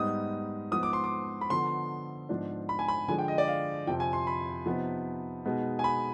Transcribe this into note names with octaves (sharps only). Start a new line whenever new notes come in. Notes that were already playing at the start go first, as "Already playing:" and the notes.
Already playing: G#2 G3 B3 D#4 D#6
G#2 F3 B3 D#6
D6
C6
D6
B5
D3 F3 B3 C6
G#2 F3 B3 D4
B5
G#5
B5
D3 F3 G#3 D4 G#5
G5
D#5
D5
F5
F2 C3 F3 G5
G#5
C6
B5
C3 F3 B3 D#4
B2 G#3 B3 D#4
G#5
B5